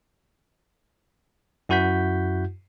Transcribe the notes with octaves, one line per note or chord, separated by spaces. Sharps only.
F#2 E4 F#4 F#5 G6 B6